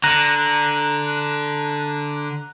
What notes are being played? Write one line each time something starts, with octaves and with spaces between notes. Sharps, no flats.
D3 A#5 F#6